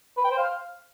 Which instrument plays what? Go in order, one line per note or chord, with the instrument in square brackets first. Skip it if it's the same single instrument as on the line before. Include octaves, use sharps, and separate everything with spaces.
[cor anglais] B4
G5
C5
F5